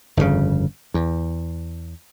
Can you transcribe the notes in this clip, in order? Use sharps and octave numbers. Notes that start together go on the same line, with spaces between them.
G1 F2 A#2 C#3
E2